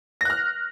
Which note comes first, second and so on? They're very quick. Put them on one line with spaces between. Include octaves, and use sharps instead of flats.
A#6 F#6 F6